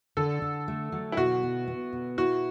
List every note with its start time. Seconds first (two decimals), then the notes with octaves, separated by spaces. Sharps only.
0.17 D3 A4
0.42 D3
0.68 A3
0.92 F#3
1.12 E4
1.17 B2 F#4
1.43 B3
1.68 B3
1.93 B2
2.18 E4 F#4